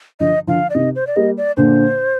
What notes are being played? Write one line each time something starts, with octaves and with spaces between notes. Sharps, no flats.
D3 F3 D#5
D3 F3 F5
D5
C3 D#3 D#5
C5
D5
G3 A#3 D#5
D5
A#2 D3 C5